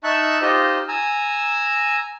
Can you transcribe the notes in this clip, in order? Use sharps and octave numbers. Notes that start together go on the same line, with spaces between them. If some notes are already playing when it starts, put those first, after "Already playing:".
D#4 E5 A5 C#6 F#6
D#4 F4 G4 C5 D#5
G#5 A#5 E6